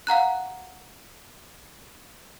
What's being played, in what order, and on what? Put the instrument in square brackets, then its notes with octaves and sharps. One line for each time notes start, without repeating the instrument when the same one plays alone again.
[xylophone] F5 F#5 A#5 F#6